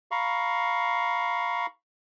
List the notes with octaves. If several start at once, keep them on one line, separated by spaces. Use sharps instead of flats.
F5 A#5 B5 C#6